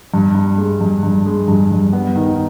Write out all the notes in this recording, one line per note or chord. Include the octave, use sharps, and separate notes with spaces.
G2
G2
G#3
G2
G2
G#3
G2
G2
B3
D#3